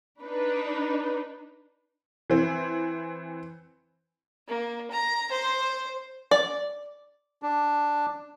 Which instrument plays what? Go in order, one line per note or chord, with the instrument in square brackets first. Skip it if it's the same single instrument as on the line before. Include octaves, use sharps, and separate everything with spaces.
[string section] D4 D#4 B4
[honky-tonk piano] E3 C4
[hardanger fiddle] A#3
A#5
C5
[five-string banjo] D5
[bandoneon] D4